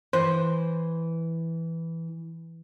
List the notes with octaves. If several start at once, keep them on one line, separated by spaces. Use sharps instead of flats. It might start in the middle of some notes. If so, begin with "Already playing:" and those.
E3 C5